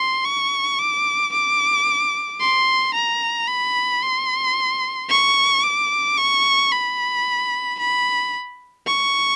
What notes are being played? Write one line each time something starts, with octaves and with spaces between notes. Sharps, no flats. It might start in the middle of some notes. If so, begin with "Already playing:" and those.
Already playing: C6
C#6
D6
D6
C6
A#5
B5
C6
C#6
D6
C#6
B5
B5
C#6